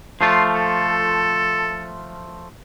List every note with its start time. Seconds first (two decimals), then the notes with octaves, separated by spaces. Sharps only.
0.21 F3 A3 F4 C6
0.55 A4